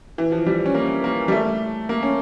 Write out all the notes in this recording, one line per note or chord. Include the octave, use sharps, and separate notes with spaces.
E3
F3
G3
C#4
A#3
A#3
G3
A3
A#3
C#4